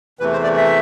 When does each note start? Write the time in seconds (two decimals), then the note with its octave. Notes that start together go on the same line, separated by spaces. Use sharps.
0.19 E2 C3 E3 A3 B4
0.32 C5
0.44 D5
0.57 E5